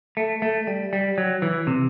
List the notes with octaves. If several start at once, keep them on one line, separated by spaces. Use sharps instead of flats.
A3
A3
G3
G3
F#3
E3
C3